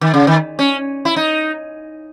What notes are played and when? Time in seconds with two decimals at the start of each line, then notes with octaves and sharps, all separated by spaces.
0.01 D#3
0.14 C#3
0.27 D#3
0.59 C#4
1.05 E4
1.16 D#4